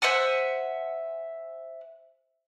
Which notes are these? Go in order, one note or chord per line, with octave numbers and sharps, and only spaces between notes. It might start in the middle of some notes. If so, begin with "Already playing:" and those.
C5 E5 F#5 G#5